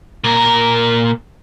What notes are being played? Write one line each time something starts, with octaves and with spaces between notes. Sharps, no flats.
A#2 A#4